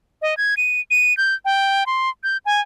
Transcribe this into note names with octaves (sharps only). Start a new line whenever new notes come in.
D#5
G#6
D#7
D#7
G6
G5
C6
G6
G#5